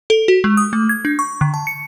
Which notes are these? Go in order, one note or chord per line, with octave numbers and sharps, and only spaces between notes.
A4
F#4
G#3
D#6
A3
G#6
D4
C#6
D3
A5
C#7